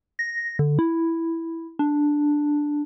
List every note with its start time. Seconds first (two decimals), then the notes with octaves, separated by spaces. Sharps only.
0.19 A#6
0.59 D3
0.79 E4
1.79 D4